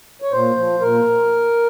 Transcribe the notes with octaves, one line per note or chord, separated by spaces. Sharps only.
C#5
A#2 C5
F3
A#2 A#4